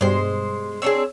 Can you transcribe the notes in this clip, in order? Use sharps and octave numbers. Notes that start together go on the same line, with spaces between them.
G2 B2 G3 G#3 C5
C4 D4 G#4 C#5 E6